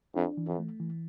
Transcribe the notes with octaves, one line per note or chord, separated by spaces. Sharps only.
F2 D4
E3
F2
A3
E3